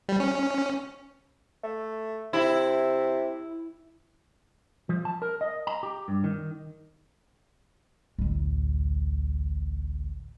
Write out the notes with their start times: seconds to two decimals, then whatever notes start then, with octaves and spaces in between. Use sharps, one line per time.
0.09 G3
0.20 C#4
1.64 A3
2.33 C3 E4
4.89 F3
5.05 A5
5.22 A#4
5.41 D#5
5.67 A#5
5.83 G4
6.08 G2
6.24 D#3
8.19 A1 D2